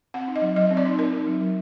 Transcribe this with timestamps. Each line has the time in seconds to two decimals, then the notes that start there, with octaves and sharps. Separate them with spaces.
0.14 C4 F#5
0.28 D#4
0.36 D#5
0.42 F#3
0.56 F#3 D#5
0.71 C4
0.77 D5
0.85 D#4
0.99 C4 A#4
1.12 D#4
1.27 F#3
1.41 F#3